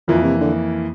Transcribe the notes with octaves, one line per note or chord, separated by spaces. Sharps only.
F2 A#2 E3 A#3
C3
D3